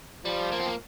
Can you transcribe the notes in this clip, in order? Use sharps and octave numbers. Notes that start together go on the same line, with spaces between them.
F3 G3
A#3
C4
A#3